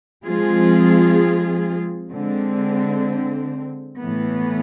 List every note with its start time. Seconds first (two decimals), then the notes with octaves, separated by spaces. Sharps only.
0.25 F3 G#3 C4 F4 G#4
2.11 D3 G#3 C4
3.98 A2 E3 B3